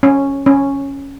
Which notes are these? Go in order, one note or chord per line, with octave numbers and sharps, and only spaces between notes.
C#4
C#4